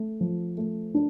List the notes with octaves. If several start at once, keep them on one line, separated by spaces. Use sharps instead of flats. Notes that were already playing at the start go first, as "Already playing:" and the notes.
Already playing: A3
F3
A3
D4